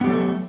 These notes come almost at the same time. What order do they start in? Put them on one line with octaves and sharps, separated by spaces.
B3 G4 F#3 A4 A3